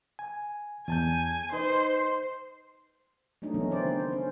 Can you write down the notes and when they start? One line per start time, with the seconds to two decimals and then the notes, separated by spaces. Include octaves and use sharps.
0.19 G#5
0.88 E2 G#5 A5 G6
1.52 D#4 B4 C5 D#5
3.42 F#3 A3 D4 D#4
3.54 C#3 E3 A#3 B3 C#4
3.71 D#3 C4 D4 E4 C5 D5
3.86 D4
4.00 C5
4.12 C#4